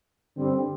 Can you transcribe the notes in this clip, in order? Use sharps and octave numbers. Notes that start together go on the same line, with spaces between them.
G2 D3 G3 C4